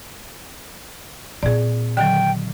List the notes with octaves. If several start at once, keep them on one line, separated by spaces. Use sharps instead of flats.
A#2 C4 G#4 D5
D3 D#3 F#3 G5